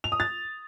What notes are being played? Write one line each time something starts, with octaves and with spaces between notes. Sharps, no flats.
F7
D#6
A6